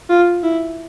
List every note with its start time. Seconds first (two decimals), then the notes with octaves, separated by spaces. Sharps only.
0.10 F4
0.43 E4